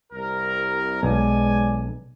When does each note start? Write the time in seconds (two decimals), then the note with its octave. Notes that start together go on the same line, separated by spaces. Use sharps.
0.13 C2 A#4
1.03 B1 G#3 D5 G#5